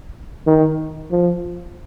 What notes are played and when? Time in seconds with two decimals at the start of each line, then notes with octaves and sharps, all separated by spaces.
0.47 D#3
1.11 F3